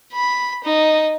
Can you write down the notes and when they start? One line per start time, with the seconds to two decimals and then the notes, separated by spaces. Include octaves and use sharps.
0.13 B5
0.64 D#4